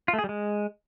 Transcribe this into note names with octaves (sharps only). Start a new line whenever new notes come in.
F4
A3
G#4
G3
G#3